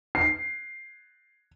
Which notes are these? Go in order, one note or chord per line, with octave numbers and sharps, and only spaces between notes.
C7